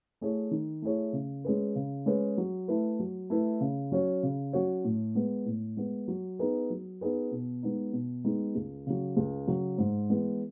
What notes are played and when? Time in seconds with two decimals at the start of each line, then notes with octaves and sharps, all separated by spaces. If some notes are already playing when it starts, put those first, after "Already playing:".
0.21 A3 E4 G#4 C#5
0.51 D#3
0.82 A3 E4 G#4 C#5
1.13 C#3
1.44 G#3 C#4 G#4 B4
1.76 C#3
2.06 G#3 C#4 G#4 B4
2.37 F#3
2.68 A3 E4 B4
2.99 F#3
3.30 A3 E4 B4
3.61 C#3
3.92 F#3 C#4 F#4 C#5
4.23 C#3
4.53 F#3 C#4 F#4 C#5
4.84 A2
5.15 G#3 B3
5.46 A2
5.77 G#3 B3
6.08 F#3
6.39 B3 D#4 G#4 B4
6.70 F#3
7.01 B3 D#4 G#4 B4
7.31 B2
7.63 G#3 B3 D#4
7.93 B2
8.24 G#3 B3 D#4
8.55 C#2
8.87 C#3 F#3
9.17 C#2
9.48 C#3 F#3
9.78 G#2
10.10 E3 G#3 B3